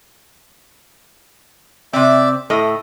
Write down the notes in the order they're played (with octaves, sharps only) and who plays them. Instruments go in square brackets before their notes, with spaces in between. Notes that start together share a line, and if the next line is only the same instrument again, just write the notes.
[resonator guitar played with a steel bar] C3 C4 [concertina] D5 E5 D6
[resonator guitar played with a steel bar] A2 D#5 [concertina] A4